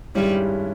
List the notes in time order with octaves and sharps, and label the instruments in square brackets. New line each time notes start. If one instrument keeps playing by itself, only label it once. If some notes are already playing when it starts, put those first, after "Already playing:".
[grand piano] G2 D#3 G#3 C#4 E4 [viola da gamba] G3